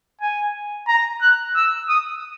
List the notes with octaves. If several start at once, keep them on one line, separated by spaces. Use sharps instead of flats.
G#5
A#5
F#6
E6
D#6